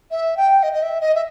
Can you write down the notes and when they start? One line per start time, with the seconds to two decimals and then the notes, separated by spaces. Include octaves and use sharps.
0.11 E5
0.37 G5
0.63 D#5
0.73 D#5
0.82 E5
1.01 D#5
1.15 E5